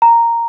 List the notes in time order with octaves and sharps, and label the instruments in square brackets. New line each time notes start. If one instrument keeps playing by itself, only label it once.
[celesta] A#5